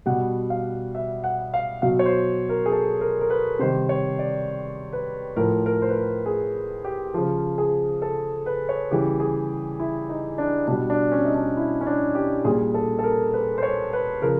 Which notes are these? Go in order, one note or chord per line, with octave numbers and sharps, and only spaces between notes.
B2 G3 F#5
F5
E5
F#5
F5
B2 F#3 F5
C#5
C5
A#4
G#4
A4
A#4
A#4
B4
C3 D#3 G3 C5
C#5
D5
B4
A2 F3 A#4
A#4
C5
B4
A#4
G#4
G4
C#3 F3
G#4
A4
B4
C#5
C#3 E3 G3 G4
G#4
E4
D#4
D4
B2 G3 D4
D4
C#4
D#4
D4
E4
C#4
D4
G4
A#2 G3 G#4
A4
A4
A#4
B4
C5
C#5
B4
C#3 F3 A#4